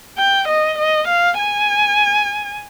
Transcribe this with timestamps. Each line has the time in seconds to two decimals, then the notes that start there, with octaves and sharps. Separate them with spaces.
0.18 G5
0.48 D#5
0.78 D#5
1.08 F5
1.39 G#5